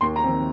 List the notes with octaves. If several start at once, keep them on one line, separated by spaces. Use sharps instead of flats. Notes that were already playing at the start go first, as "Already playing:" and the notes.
D#2 C6
A#5
D#3 C4